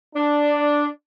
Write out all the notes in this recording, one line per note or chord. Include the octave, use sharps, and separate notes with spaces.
D4